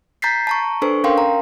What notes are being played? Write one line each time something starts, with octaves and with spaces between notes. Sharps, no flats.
A#5 G6 A6 B6 C7
A5 A#5 C#6
D4 A4 B4 C5 C#6
C#4 A#4 F5 G5 C6
A#5